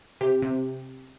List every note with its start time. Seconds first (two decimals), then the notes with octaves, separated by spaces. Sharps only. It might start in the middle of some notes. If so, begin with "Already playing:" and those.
0.21 C3 G4
0.42 C3